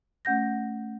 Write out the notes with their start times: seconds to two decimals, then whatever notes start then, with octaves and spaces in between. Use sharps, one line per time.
0.25 A3 C#4 F#5 G6 A#6